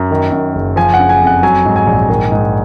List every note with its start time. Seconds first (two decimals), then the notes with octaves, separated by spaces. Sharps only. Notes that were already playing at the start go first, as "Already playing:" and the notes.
Already playing: F#2
0.11 D#3
0.32 F#2
0.55 F#1
0.76 F3 G#5
0.94 F#5
0.99 C#3
1.09 G#5
1.21 F2
1.27 F#5
1.43 F#3 G#5
1.65 G#2
1.76 G#5
1.87 A#1
2.09 D#3
2.32 G#2